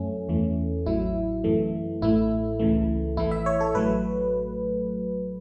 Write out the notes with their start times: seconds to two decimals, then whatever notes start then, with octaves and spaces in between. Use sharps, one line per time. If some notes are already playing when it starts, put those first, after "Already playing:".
Already playing: F#2 F#3 A3 C#4
0.28 E2 E3 A3
0.86 A1 A2 F#3 E4
1.44 F#2 E3 A3
2.01 A1 A2 A3 E4
2.59 C#2 C#3 E3 A3
3.17 A1 A2 E3 A3 E4
3.31 E5
3.46 C#5
3.61 A4
3.75 A1 A2 F#3 A3 B4